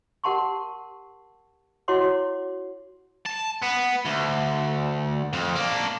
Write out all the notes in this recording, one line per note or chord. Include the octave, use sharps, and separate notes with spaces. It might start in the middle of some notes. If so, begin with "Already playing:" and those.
G4 A#4 F#5 A5 C6 C#6
E4 F#4 C#5 F#5 C6 D6
A5
B3
D2
F2
A#3 D4